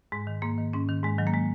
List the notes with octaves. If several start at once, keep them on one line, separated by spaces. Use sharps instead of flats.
G#2 G#3
D#3
G#2 A#3
D#3
G#2 C#4
D#3
G#2 G#3
D#3 F#3
A#3
G#3